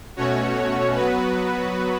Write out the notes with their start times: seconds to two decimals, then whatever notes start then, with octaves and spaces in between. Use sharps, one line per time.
0.17 B2 A3 C#4 F#4 C#5
0.95 F#3 B3 F#4 B4